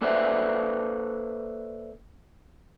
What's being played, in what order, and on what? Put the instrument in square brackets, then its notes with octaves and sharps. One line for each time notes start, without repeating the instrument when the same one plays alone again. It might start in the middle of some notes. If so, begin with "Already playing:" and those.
[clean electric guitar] A#3 A4 B4 C5 D5 E5